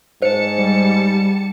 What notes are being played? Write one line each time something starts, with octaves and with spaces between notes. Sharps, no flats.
G#2 C5 A5 C#7
G3